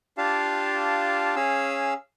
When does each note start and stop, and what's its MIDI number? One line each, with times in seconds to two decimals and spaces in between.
0.18 1.36 62
0.18 1.36 65
0.18 1.36 67
0.18 1.36 77
0.18 1.36 81
1.36 1.94 61
1.36 1.94 68
1.36 1.94 77
1.36 1.94 88